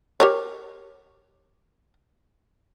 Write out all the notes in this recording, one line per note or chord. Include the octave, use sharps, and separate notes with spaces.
G4 A#4 C#5